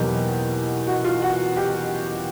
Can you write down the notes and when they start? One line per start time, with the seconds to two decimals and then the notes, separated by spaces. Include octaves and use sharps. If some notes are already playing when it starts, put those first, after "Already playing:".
Already playing: E2 B2 F#3 A#3 D#4 G4
0.87 F#4
1.04 F4
1.22 F#4
1.57 G4